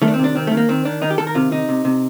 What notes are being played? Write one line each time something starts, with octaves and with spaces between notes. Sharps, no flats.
D#3 A3
D4
C4
C3 D4
D#3 C4
D#3 A3
A#3
D#3 C4
D#3 D4
D#3 D#4
G4
D#3 A4
A#4
C3 F4
C3 D#4
C3
C3